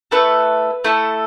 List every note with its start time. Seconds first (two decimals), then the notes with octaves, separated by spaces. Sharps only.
0.11 A3 E4 A4 B4
0.84 A3 E4 A4